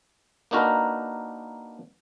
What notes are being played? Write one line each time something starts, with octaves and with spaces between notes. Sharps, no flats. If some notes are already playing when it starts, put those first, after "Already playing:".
A#3 D4 D#4 F#4 A#4 B4